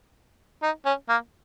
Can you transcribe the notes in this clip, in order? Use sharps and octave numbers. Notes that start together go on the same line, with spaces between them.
D#4
C#4
A#3